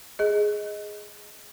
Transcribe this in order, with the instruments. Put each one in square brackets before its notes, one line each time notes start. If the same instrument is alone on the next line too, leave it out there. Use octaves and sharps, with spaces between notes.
[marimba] G#4 D#5